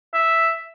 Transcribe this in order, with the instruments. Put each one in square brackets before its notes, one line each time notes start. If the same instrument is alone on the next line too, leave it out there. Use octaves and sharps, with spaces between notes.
[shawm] E5